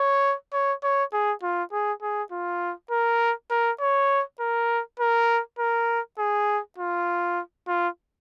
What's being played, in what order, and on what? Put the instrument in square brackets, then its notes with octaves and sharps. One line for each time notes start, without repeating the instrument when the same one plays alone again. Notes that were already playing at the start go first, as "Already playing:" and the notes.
Already playing: [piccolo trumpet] C#5
C#5
C#5
G#4
F4
G#4
G#4
F4
A#4
A#4
C#5
A#4
A#4
A#4
G#4
F4
F4